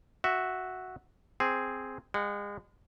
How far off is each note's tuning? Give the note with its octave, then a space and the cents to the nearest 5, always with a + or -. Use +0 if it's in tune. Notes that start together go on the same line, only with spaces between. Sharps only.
F#4 +0 E5 -5
C4 +0 G#4 +0
G#3 -35 F#5 +0